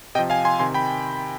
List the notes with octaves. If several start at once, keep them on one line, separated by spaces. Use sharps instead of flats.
C3 F3 D#5 G5
F5 G#5
G#5 C6
C3 D#3 G#5 C6
G5 B5